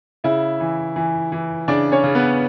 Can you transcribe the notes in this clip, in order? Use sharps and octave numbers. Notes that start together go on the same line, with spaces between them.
C#3 E4 E5
E3
E3
E3
C#3 D4 D5
C#4 C#5
C#3
B3 B4